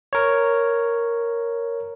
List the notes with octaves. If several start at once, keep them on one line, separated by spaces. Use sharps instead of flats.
A#4 C#5